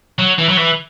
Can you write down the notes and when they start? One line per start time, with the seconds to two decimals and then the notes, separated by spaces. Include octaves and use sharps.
0.19 F#3
0.38 E3
0.49 F#3
0.57 E3